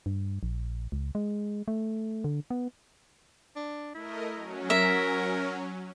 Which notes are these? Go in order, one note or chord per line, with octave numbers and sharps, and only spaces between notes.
G2
A#1
C#2
G#3
A3
D3
B3
D4
A3 E4 A#4 D#5
F#3 C#4
A#4 E5